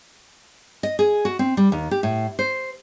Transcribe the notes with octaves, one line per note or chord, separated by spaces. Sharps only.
D#5
G#4
F#4
C4
G3
D#2
G4
A2
C5